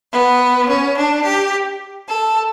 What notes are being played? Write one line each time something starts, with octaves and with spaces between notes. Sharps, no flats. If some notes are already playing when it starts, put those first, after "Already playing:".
B3
C#4
D4
G4
A4